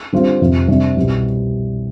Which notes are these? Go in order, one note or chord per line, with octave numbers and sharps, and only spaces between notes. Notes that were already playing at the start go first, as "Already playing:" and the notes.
D3 G3 C4 F4
F2 C3 F3
C3 G3 D4
C2 B2 G3